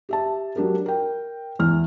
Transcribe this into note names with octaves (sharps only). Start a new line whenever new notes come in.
G4 E5 A5
F#3 D4 G4 A#4
A#4 G5
E2 E3 F6